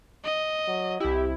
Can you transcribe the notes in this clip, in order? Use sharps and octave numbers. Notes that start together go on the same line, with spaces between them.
D#5
F#3
C2 E4 G4